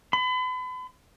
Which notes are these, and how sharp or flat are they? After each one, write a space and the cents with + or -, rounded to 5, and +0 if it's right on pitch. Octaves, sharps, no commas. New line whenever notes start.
B5 +40